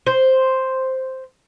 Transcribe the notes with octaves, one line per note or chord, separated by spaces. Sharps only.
C5